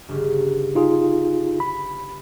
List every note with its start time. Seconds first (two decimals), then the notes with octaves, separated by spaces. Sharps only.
0.08 G1 C#3
0.75 D#4 F4 G#4
1.60 B5